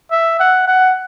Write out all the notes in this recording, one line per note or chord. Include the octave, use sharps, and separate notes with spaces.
E5
F#5
F#5